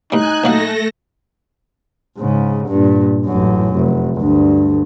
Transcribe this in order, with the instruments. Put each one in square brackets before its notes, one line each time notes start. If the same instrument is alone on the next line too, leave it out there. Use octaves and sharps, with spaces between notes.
[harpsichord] A2 G3 [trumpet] D#4 [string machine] G#5 F#6
[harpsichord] A#1 F#3 F5 [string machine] A3 A4 A#6
[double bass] G#2 C#3
G2 A#2
A1 F#2
F1
D2 G2